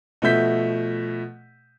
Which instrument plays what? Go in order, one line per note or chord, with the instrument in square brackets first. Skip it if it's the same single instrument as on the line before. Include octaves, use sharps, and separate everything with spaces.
[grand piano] B2 F3 A3 E5 G6 B6